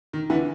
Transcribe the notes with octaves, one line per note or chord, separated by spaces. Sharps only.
D#3
D3 E3